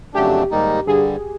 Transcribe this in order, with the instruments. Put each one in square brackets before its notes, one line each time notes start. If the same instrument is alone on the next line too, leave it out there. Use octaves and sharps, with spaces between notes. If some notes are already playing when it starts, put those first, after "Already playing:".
[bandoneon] F2 C#3 F#3 A3 D4 [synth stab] G4
[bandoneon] G#2 D#3 G3 A#3 D#4
[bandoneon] G2 D3 G3 [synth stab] G#4